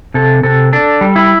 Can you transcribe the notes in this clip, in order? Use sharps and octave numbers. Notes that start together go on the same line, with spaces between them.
C3 A4
C3 A4
D4 A4
G3
E4